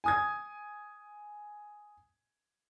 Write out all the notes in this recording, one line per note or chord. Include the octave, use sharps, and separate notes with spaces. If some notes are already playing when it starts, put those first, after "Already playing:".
G#5 D#6 G#6